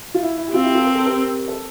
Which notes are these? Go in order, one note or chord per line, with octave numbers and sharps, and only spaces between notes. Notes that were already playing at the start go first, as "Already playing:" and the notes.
F4
E4
E4
G4
C4 F4
E4 G4
F4 A4
A#4
A4
G4 A#4
A4 C5